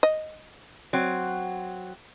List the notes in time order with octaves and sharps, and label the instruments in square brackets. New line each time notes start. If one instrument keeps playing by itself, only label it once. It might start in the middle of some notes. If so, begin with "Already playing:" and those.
[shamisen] D#5
[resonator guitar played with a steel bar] F#3 C4